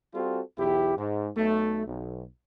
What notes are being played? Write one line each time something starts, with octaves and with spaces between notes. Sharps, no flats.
G3 C4 F4 F#4 A4
B1 E2 E4 G4
G#2
B1 A3
B1